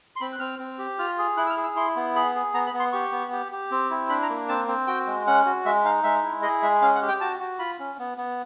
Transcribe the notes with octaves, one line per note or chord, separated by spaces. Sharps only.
C6
C4 B5
F#6
C4 F6
C4
G4
F4 F6
G#4
E4 F#6
E6
F6
G#4
E6
E4 C6
B3
G#4 B5
G#4
B3 A#5
B5
B3
C6
G4 C#6
B3
G4
G4
C4
E4
D4 B5
A#5
A#3
C4 A5
C4
F#4 G5
G#3
C#4 F#5
F#4
G#3 E5
D#4 F5
G#3 E5
E4
G#4 D#5
G#3 E5
C#4 F5
F#5
G4
G5
F#4 A5
F#4
F4 B5
C#4
B3
B3